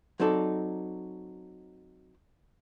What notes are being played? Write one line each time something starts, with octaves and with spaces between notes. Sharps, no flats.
F#3 C4 D#4 A4 D5